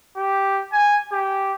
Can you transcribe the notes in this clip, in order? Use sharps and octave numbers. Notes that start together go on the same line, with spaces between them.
G4
G#5
G4